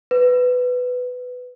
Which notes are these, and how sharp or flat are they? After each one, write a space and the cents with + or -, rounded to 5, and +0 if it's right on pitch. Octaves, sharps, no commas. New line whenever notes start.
B4 +10